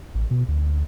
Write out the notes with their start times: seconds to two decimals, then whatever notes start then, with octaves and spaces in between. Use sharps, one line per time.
0.15 A1
0.31 B2
0.48 D2